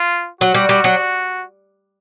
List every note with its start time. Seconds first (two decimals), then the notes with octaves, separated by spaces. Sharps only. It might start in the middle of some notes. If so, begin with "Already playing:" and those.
Already playing: F4
0.41 F#3 F#4
0.55 G3
0.69 G3
0.84 F#3